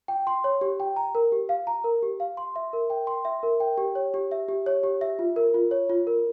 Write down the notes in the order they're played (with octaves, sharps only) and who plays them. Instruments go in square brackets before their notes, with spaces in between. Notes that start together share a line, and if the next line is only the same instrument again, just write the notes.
[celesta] G5
C6
C#5
G4
G5
A#5
A#4
G4
F5
A#5
A#4
G4
F5
C6
E5
A#4
G5
C6
E5
A#4
G5
G4
C#5
G4
E5
G4
C#5
G4
E5
F4
A#4
F4
C#5
F4
A#4